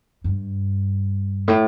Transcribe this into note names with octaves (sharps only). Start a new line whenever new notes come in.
G2
A2